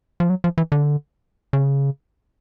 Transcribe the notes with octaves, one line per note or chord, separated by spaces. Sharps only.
F3
F#3
F3
E3
D3
C#3